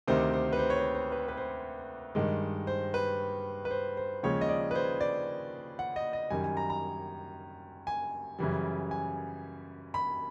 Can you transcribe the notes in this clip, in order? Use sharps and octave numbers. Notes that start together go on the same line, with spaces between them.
D2 C3 D#3 C5
C5
B4
C5
C#5
C5
C5
B4
B4
C5
G2 D#3 G#3
C5
B4
B4
C5
C5
D#2 C#3 F3 G#3 C#5
D#5
D5
B4
C5
D5
F#5
D#5
D#5
F#2 D#3 G3 G#5
G#5
A#5
A#5
G#5
F#2 C#3 E3 G3
G#5
B5